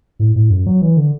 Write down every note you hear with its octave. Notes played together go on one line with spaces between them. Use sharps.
A2
A2
F#2
F#3
E3
D3